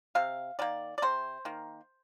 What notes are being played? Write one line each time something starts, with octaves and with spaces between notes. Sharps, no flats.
C3 F5
D#3 A#3 D5
D5
C3 C5
D#3 A#3